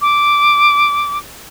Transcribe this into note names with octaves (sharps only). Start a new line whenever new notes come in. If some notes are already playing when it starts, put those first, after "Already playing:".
D6